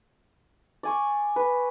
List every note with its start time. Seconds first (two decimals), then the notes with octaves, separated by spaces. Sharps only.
0.83 D5 G#5 C#6
1.36 B4